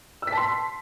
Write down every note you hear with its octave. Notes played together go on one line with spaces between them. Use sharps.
E6
B6
A5
C6